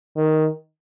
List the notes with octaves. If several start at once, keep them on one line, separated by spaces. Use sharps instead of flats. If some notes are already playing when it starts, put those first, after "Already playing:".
D#3